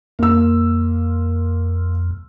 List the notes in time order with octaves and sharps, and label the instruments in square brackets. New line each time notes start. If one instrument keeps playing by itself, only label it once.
[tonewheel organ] F2 [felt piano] A#3 E6